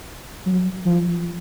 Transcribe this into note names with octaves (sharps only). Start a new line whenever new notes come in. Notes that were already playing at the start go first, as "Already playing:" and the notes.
F#3
F3